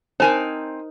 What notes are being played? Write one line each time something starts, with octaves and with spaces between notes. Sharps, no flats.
C4 D#4 A#4 C5 G#5 A5